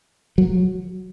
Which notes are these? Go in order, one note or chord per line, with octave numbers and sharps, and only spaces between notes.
F#3